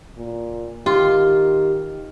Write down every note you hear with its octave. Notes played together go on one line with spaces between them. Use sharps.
A#2
D#3 F4 G4